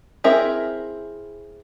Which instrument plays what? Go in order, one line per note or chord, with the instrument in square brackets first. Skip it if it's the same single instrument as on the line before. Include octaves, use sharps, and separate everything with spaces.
[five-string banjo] C4 E4 G#4 A#4 E5